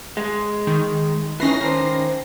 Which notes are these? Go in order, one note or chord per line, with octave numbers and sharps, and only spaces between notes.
G#3
D#3
E3 C#4 D#4 A#6 C7
D#3 C5